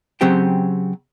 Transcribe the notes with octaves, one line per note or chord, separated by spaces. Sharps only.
C#3 F#3 C4 G4 C5 G5